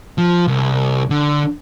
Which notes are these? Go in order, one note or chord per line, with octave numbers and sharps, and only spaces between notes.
F3
C2
D3